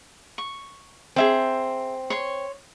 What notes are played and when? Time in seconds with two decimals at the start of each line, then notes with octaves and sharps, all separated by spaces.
0.38 C#6
1.16 C4 G#4 E5 A5
2.10 C#5 C6